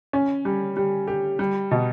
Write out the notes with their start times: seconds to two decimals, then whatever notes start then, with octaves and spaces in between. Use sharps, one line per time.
0.13 C#4
0.45 G3
0.77 G3
1.07 G4
1.39 G3
1.71 B2